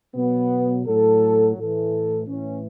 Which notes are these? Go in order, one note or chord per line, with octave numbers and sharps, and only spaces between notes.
B2 F#3 B3
A2 F#3 A4
A2 E3 A4
A2 E3 C#4